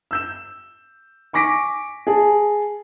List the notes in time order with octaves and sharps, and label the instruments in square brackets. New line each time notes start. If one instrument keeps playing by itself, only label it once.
[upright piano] E6 G6 E7
G#5 C#6 D6 A#6 B6 D7
G#4 A5